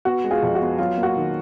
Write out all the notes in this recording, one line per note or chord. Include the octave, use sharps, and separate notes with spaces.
B3 F#4
G#3
F4 G#4
F2
F#4
B3
F#3 F4
A#3
F#4
D#3